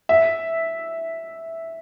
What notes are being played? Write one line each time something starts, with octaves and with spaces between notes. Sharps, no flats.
E5